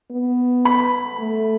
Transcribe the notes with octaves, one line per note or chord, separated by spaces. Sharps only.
B3
B5
A3